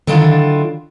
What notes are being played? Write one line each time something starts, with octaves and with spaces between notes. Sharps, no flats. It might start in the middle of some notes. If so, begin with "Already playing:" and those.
D3 D#3 F#3 D4 E4 F4